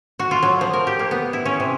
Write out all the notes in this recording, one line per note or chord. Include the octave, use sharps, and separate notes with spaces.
F#4
F4
F#3
F3
A#4
G4
A#3
B3
E4
C#4
C3